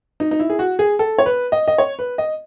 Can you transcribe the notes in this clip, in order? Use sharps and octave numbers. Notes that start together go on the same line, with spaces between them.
D#4
D#4
E4
G#4
F#4
G#4
A4
C#5
B4
D#5
D#5
C#5
B4
D#5